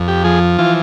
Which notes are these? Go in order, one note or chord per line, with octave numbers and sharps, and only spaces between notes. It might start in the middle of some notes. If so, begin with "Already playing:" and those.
Already playing: F2
G4
F3 G#4
E3 F4